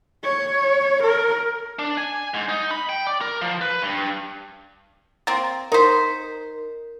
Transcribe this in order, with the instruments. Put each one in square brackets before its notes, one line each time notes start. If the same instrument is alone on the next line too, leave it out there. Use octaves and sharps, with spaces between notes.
[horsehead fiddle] C#5
A#4
[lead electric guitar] D4
G#5
G#2
D#4
B5
G5
D5
A#4
F3
B4
G2
[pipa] A#3 C4 [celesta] A6
[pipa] D#4 C5 [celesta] A#4 B6